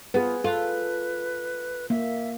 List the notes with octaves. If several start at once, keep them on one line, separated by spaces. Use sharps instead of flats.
B3 F4 G#4 B4
F4 A4 B4
A#3 E5